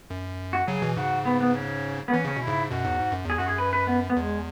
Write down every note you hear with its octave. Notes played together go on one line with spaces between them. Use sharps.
F#2
F#4
C#3 F#3 G#4
B2 E3
G#2 C#3 F#4
B3
B3
C#4
B3
E3 C#4
C#3 C#4
B2
E4
G#2 C#3
F#2 B2 F#4
E2 G#2
G#2
F#2
E2 G#4
F#2 F#4
G#4
B4
B4
B3
B3
E2 G#3